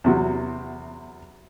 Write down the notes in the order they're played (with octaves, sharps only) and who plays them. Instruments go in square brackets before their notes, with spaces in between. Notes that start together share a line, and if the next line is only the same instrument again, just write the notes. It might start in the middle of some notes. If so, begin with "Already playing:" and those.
[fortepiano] E2 C3 F#3